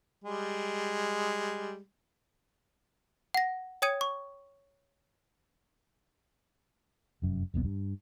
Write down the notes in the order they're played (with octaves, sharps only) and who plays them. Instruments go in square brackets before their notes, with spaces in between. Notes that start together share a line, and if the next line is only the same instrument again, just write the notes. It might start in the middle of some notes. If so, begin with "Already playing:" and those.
[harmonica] G3 G#3
[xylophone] F#5 A#6
C#5 G5 D#6 G#6 C#7 D#7
C#6
[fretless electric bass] F1 F#2
E1 B1 C#3 B3
G2